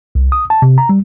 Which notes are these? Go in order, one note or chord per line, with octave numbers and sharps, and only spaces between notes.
C2
D#6
A5
C3
A#5
G3